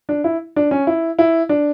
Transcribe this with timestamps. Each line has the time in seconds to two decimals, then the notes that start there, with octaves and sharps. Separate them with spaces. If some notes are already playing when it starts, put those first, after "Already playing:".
0.09 D4
0.24 E4
0.56 D4
0.71 C#4
0.87 E4
1.19 E4
1.49 D4